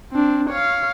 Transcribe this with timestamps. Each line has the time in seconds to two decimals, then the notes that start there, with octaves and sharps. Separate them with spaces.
0.12 C4 D4
0.50 C#5 F5